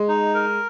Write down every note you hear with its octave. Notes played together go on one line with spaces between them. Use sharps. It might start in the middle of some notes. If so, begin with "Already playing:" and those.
Already playing: G#3
D#4
A#4